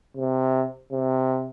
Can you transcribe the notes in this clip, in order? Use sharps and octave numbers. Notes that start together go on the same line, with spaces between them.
C3
C3